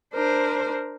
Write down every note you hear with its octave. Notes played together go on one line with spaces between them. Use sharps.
D4 A#4 C5